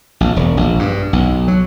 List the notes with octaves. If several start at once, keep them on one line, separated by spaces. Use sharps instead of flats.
A#1
E1
A#1
G2
B1
F#3